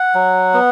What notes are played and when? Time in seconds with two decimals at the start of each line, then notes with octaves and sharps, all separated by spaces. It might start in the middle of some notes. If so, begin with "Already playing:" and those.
Already playing: F#5
0.15 F#3
0.54 B3